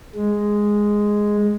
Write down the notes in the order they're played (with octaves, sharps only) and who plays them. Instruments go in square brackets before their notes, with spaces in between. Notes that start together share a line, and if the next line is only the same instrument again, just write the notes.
[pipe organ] G#3